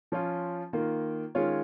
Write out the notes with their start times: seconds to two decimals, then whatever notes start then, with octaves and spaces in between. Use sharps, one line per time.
0.12 F3 C#4 F4
0.73 D#3 A#3 F4
1.35 D#3 G#3 C#4 F4 C#5